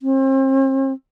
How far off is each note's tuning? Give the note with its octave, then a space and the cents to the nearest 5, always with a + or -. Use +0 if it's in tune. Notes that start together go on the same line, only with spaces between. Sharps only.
C4 +40